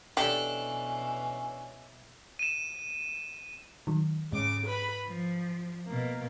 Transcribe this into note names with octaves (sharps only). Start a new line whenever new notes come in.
B2 E3 C#4 D4 G4 A4
D#7 E7
D#3 F#3
G#2 C#3 D6
B4 B5
F3
B2 A#3